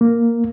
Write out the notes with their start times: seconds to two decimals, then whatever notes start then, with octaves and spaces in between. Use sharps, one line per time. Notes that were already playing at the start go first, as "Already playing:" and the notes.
0.01 A#3